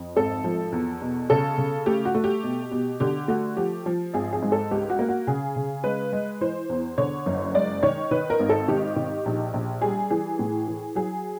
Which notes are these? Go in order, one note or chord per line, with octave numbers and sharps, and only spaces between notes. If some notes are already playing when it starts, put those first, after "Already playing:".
Already playing: F2
G#1 A4
F3
E2
B2
C#3 A4
C#3
A3 G4
F#4
A3
G4
B2
B2
D3 G4
A3 F#4
F3 G4
F3
G#1 G#4
G#4
G#2
A4
C#2 G4
F#4
A#3
F#4
C#3 G#4
C#3
G#3 B4
G#3
E3 C5
E2
D3 C#5
F#1
G#3 D5
D#3 C#5
D#3 B4
A#4
G#1
A4
D#3 G4
D#3
A#1
A#1
G3 G#4
E3 G#4
A2
E3
F#3 G#4